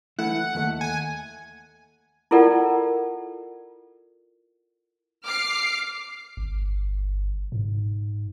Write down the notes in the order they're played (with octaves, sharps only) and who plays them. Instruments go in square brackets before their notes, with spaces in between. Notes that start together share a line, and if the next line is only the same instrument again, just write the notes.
[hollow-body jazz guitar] E3 A3 E4 [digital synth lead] F#5
[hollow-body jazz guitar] D#2 A3
[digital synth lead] G#5
[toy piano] E4 F4 A4 A#4 D5 F#5
[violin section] D6 F6 C7
[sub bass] G1
G#2